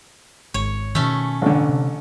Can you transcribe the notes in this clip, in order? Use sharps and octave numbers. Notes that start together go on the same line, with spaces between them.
G#1 C#5
B2 D#3 A3 C#4
A1 D3
C3